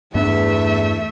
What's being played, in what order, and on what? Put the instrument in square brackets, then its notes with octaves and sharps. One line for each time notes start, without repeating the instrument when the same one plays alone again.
[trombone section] E2 [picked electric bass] G2 B3 D4 [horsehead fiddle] A3 [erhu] E5